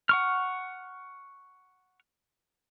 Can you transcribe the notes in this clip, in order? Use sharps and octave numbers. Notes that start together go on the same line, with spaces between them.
F#5 C#6 F6